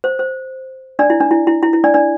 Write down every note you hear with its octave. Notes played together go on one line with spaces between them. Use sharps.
C5
C5
D4 D5
E4
D4
E4
E4
E4
E4
D4 D5
D4 D5